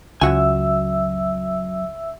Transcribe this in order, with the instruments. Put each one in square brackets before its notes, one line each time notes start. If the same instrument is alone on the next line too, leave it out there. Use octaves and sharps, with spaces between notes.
[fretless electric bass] C#2 [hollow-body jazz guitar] F#2 F#4 G#5 [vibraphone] E5 E6